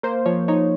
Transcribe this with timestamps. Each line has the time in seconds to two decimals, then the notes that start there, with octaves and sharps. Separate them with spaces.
0.03 A#3 C5
0.26 F3 C#5
0.48 D#4 C#5